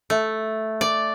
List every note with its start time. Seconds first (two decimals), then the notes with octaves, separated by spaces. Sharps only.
0.10 A3
0.81 D5